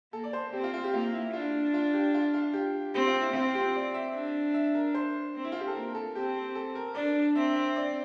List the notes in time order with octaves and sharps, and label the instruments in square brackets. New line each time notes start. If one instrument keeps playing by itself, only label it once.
[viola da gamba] A#3 [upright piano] A4
[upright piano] D5
C5
[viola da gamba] C4 [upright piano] G4
[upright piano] F4
F4
G4
[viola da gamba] A#3 [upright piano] F4
[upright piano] E4
[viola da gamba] D4 [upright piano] F4
[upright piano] F4
G4
F4
F4
G4
[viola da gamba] C4 [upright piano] G4
[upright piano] F4
E4
[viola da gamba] C4 [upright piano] F4
[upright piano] G4
D5
E5
[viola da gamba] D4
[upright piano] E5
A#4
C5
[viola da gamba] C4
[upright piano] E4
F4
G4
A4
[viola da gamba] A#3 [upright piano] A#4
[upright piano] A4
[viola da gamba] C4 [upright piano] G4
[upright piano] A4
A#4
[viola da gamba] D4 [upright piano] D5
[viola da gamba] C4 [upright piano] E5
[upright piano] E5
D5